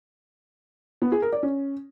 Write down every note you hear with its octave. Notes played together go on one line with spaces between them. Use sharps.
B3
G#4
A#4
D5
C#4